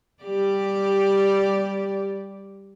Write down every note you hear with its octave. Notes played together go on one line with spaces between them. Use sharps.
G3 G4 D5